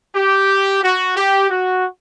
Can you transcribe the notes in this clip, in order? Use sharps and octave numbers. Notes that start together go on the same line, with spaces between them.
G4
F#4
G4
F#4